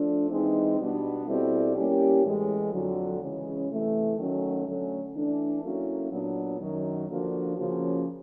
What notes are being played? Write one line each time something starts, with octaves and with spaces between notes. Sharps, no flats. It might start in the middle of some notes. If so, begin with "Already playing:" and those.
Already playing: F3 A3 D4
E3 G#3 C4 D#4
B2 G3 B3 D4
B2 G3 C4 E4 A4
G3 A#3 C#4 E4 G4
A2 E3 G#3
F2 D3 F#3
C#3 E3 G#3 C#4
C3 E3 A3
D#3 F#3 A3 C#4 F#4
D3 F#3 A3 C#4
E3 A3 D4
F#3 A#3 C#4 E4 A4
A#2 F#3 B3 D4 F#4
F#2 D#3 F#3
D3 F3 A#3 D4 F#4
C#3 F3 A#3 C#4 F#4